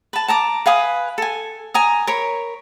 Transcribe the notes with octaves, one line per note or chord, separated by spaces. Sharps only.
B4 A5
A5 A#5 D6
B4 F5 G#5 D#6
A4 G#5
G#5 A#5 D#6
A#4 C#5 B5